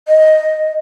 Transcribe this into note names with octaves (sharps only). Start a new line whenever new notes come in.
D#5